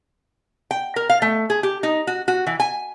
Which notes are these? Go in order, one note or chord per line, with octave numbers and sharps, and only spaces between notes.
G5
A#4
F5
A3
G#4
G4
D#4
F#4
F#4
E3
G#5